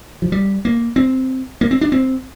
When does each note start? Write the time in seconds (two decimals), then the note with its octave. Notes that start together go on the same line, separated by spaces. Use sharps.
0.22 F3
0.32 G3
0.65 A#3
0.96 C4
1.61 A#3
1.71 C4
1.81 D4
1.92 C4